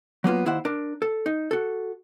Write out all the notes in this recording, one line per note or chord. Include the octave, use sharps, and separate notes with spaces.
F#3 A#3 B3 F4
D#2 E4 C5 F#5
D4 A#4
A4
D#4
F#4 A4